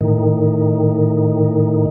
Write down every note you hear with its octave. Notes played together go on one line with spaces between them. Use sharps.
A2 D#3